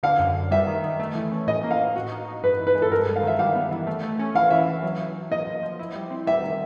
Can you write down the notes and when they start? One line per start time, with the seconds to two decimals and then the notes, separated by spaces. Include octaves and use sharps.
0.03 D3 F5
0.19 F#2
0.35 F#2
0.51 G3 E5
0.67 D#3
0.83 D#3
1.00 A3
1.15 E3
1.32 C#4
1.47 A2 D#5
1.63 A#3
1.71 F5
1.79 A#3
1.96 F#4
2.11 D#4
2.27 D#4
2.43 G2 B4
2.60 E3
2.67 B4
2.75 G#3
2.82 A4
2.91 G2 A#4
3.07 G2
3.16 F5
3.23 D#3 E5
3.39 G3 F5
3.55 B3
3.71 E3
3.87 A3
4.03 A3
4.19 C#4
4.35 E3 F5
4.50 E3 E5
4.67 E3
4.83 F#3
4.99 F#3
5.15 F#3
5.31 A#3 D#5
5.47 F3
5.63 F3
5.79 E4
5.95 G3
6.11 C4
6.27 G3 E5
6.43 D#3